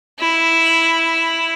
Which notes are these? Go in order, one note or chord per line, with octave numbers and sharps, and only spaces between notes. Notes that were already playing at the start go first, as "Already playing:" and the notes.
E4